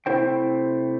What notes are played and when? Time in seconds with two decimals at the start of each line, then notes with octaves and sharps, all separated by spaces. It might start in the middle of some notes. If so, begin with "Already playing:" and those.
0.06 C3 A3 E4 C5 G5